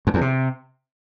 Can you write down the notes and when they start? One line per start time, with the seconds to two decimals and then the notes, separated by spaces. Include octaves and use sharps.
0.07 F2
0.14 E2
0.21 C3